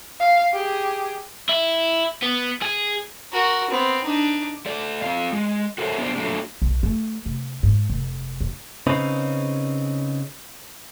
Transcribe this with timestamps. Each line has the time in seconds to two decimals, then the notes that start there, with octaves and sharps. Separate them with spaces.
0.20 F5
0.53 G4 G#4
1.49 E4
2.22 B3
2.62 G#4
3.33 F#4 A#4
3.70 B3 C4
4.05 D4 D#4
4.66 A3 D5
5.02 C4 F4 F5
5.33 G#3
5.78 F#4 A4 A#4 C5 C#5 E5
5.98 B3 D4 G#4 A#4 C5 D5
6.16 F#3 A3 A#3 D4
6.62 B1
6.83 A3
7.26 C3
7.63 G#2
7.90 F1
8.41 D4
8.87 C#3 C4 C#4 D#4 B4